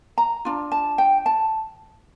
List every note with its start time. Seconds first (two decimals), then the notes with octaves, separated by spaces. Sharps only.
0.18 A#5
0.45 D4 F4
0.72 A5
0.98 G5
1.26 A5